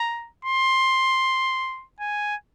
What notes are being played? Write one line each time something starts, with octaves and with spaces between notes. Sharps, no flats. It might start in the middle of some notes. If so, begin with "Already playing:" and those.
Already playing: A#5
C6
G#5